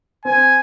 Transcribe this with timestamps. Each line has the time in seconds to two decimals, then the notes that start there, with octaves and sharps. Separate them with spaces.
0.25 C4 G#5